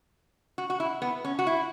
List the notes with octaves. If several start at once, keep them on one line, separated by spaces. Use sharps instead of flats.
F#4
F#4
E4
B3
C#4
F#4
E4